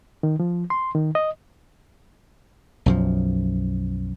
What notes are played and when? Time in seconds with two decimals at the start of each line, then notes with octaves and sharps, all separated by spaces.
0.23 D#3
0.40 F3
0.70 C6
0.95 D#3
1.15 D#5
2.86 B1 F#2 F3